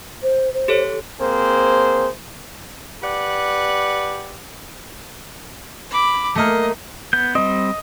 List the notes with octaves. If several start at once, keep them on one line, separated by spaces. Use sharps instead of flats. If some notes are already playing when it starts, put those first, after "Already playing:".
C5
C5
G4 A4 C#5
A#3 C4 G#4 C5
G4 B4 D5 F#5
B5 D6
A3 A#3 D#5
B3 G6
G3 C4 D#5